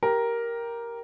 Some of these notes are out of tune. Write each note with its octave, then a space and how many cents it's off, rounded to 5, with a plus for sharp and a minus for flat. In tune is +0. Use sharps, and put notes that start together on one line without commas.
G4 +0 A#4 +5